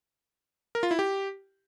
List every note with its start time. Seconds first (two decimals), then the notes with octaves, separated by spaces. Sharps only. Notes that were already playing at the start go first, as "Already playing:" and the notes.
0.75 A#4
0.83 F4
0.91 E4
0.99 G4